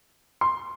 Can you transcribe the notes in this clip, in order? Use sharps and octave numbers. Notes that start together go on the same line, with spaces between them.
C6